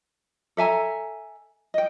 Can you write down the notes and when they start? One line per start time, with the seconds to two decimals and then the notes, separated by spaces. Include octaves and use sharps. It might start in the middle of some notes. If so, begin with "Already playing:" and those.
0.57 A4 E5 G#5 A#5
1.74 D#5 G5